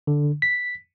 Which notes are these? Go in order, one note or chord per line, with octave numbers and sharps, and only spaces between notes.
D3
B6